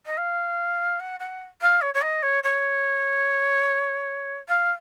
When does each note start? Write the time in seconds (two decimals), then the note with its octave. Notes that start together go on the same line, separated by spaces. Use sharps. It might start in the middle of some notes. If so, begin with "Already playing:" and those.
0.06 D#5
0.17 F5
0.99 F#5
1.20 F#5
1.61 F5
1.81 C#5
1.94 C#5
2.01 D#5
2.22 C#5
2.43 C#5
4.48 F5